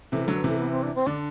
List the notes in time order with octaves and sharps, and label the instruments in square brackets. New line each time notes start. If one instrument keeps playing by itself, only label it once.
[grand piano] C3 E3 [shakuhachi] A4
[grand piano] D3 F#3 [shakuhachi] A4
[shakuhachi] B4
[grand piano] C3 E3 [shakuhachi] A4
[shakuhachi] B3
C4
D4
C4
[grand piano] D3 [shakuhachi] D4